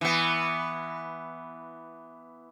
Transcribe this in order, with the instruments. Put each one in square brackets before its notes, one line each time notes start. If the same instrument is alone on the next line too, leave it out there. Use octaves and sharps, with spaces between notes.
[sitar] E3 B3